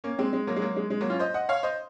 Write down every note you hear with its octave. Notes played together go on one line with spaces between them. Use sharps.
A#3 C#4
G#3 C4
G#3
F#3 A#3
G#3
F#3 A#3
G#3
G#3
F#3 A#3
C#4 F4
C5 D#5
D#5 F#5
C#5 F5
C5 D#5